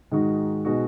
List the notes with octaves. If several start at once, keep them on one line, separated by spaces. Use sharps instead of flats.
G#2 D#3 G#3 D#4 F#4
B2 G#3 D#4 F#4